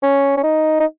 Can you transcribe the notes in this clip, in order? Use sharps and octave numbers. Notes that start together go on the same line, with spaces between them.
C#4
C#4
D#4
D#4